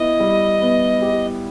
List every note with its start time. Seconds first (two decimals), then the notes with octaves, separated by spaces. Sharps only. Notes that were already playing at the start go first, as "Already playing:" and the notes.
Already playing: B3 E4 D#5
0.20 G3
0.61 B3
1.02 G4